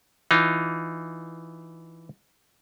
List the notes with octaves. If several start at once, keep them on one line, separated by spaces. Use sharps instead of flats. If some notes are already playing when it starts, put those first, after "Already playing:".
E3 D#4 F4